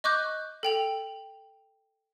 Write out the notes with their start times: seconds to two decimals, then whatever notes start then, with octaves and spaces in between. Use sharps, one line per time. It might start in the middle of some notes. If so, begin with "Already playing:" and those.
0.04 D#5 C#6 D6 F#6 G6
0.63 A4 G5 F7